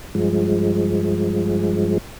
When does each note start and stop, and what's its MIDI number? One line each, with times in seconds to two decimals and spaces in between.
0.15 1.98 43
0.15 1.98 53
0.15 1.98 56